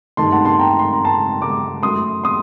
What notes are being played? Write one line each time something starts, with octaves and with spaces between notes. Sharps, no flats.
G2 D#3 A3 A5 C6
F#5 A5
A5 C6
G5 A#5
C6
A#5
A5 C6
A#5 D6
F#2 F#3 A3 C6 D#6
C6 D#6